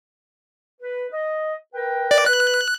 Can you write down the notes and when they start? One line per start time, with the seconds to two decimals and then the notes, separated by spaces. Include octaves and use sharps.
0.81 B4
1.12 D#5
1.74 A#4 B4 G5
2.11 D5
2.26 B4 F#6